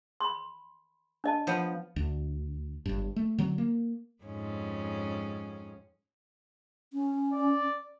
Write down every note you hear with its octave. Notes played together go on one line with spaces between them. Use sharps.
B5 C6
D4 D#5 A5
F3 B3
D2
G1 G2
A3
D3 F#3 C4
A#3
F2 G#2 C#4
C#4
D5